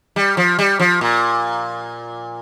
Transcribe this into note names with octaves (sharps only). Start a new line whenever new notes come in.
G3
F3
G3
F3
A#2